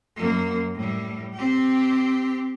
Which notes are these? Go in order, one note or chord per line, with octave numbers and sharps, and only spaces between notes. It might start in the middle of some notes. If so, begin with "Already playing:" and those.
F#2 A#3
A2 G3
C4 G4